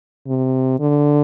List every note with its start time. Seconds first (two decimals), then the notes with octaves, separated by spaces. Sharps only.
0.26 C3
0.80 D3